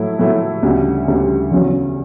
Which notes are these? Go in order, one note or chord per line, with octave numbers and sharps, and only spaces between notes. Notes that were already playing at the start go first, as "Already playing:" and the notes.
Already playing: A2 F#3 A3 E4
A2 F#3 A3 E4
D2 C#3 G3
D2 C#3 G3
E2 C#3 F#3